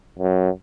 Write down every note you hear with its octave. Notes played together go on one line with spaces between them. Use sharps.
F#2